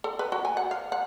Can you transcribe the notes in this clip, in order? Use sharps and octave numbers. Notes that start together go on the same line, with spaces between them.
A4
B4
F#4
G#5
F#5
F5
F#5